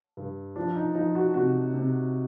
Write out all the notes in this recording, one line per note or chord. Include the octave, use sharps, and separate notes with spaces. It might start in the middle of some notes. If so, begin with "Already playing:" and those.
G2
F3 D4
D#4
F3 D#4
F#4
C3 F#4
C3